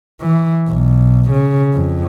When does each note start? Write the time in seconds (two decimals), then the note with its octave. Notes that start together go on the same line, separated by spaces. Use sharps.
0.21 E3
0.68 B1
1.31 C#3
1.74 F2